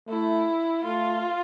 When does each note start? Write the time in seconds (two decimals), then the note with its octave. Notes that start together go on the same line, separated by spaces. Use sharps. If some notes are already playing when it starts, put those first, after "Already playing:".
0.08 A3 E4
0.84 A3 F4